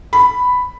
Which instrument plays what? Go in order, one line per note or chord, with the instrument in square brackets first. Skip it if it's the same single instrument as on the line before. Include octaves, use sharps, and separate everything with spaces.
[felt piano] B5